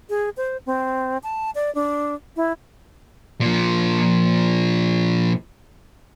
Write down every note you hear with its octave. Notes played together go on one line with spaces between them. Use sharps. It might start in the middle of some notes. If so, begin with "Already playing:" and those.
G#4
C5
C4
A5
D5
D4
E4
A#2 F3